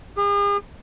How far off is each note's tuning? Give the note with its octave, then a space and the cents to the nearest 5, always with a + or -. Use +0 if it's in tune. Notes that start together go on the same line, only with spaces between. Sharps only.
G#4 -45